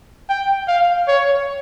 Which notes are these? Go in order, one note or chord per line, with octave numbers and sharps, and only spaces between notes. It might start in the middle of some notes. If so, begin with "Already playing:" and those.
G5
F5
C#5